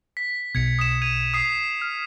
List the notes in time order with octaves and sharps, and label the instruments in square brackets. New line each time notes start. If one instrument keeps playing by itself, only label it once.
[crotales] B6
[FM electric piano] B1 B2 [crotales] G#6 C#7
[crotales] D#6 E7
G#6 D#7 F7
D#6 C7
[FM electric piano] F6